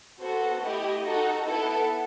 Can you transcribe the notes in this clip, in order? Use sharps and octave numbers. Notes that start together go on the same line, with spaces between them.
B3 F#4 A4 C5
A3 E4 G4 D#5
D#4 F#4 A4
B3 E4 A4